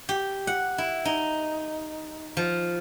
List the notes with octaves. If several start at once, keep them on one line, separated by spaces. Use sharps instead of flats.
G4
F#5
E4
D#4
F3